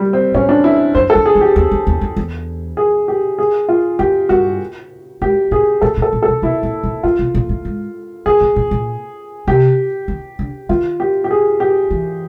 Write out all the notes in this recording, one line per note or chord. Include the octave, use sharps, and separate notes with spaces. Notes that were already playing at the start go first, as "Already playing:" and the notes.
Already playing: G3
C4
A2 C#4
D4
E4
F#2 C5
A4
F2
G#4
E2
G4
E2
F2
E2
F2
E2
G#4
G4
G#4
F4
F2 G4
G2 F#4
G#2 G4
A2 G#4
A#2 A4
A#2
A4
A#2
A4
B2
B2 E4
A#2
A#2
A2 F4
B2
A#2
A2
G#2
A2 G#4
A2
A#2
A#2
C3 G4
D#3
D3
D#3 F4
G4
G4
G#4
G4
E3